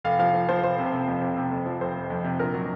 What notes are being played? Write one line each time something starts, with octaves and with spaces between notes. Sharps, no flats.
F1 F5
F3 F5
F3
F3 C5
F1 C5
C3
C3
F2
C3
C3
F2
F3
F1 C5
F2
F2
C3
A#1 A#4
F#3